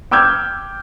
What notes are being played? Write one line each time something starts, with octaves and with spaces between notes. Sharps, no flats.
G5 D6 E6 F6 G6 G#6